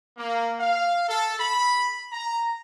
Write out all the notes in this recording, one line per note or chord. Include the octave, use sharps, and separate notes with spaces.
A#3
F5
A4
B5
A#5